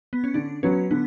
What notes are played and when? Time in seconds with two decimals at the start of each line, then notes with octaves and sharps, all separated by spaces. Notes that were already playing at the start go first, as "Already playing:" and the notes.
0.13 B3
0.24 C#4
0.34 D3 D4
0.63 F#3 B3 C#4
0.91 D3 B3